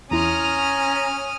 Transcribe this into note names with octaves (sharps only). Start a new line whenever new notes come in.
E2 C#4 E4 A#5 C6 D#6 F6